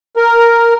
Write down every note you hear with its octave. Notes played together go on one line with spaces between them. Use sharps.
A#4